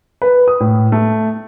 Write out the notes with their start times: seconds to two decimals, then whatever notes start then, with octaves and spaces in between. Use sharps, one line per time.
0.22 B4
0.48 D#6
0.60 A2
0.92 A3